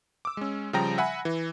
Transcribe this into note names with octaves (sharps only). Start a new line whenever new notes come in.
D6 E6
G#3 C#4
C#3 F3 G3 G5 A#5 A#6
E5 F#5 G#5 B5
E3